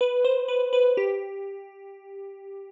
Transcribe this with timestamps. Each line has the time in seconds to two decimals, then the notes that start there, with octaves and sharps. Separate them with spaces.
0.01 B4
0.24 C5
0.48 B4
0.73 B4
0.97 G4